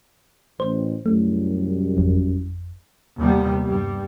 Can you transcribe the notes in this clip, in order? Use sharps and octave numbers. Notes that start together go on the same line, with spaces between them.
A1 C5
C2 F#2 A3
G#1 F2
D#2 C3 G3 B3
G2 G3